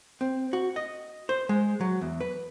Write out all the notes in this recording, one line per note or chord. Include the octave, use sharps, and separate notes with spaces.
C4
F#4
D#5
C5
G#3
F#3
E2
B4